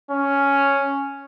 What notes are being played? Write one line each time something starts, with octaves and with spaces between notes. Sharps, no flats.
C#4